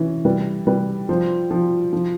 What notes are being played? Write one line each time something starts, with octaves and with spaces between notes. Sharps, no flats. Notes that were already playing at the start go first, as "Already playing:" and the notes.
Already playing: E3 C#4
G3 B4
G3 B4
F3 C5
F3
F3